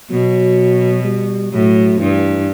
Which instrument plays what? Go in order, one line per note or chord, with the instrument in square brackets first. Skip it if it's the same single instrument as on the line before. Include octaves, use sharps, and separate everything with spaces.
[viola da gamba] B2 [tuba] F#3
[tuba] G3
[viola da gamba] A2 [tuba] F#3
[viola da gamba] G2 [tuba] E3